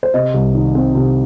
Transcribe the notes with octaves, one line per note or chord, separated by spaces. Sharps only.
C5
C3 D#5
C2
D#3
C4
C3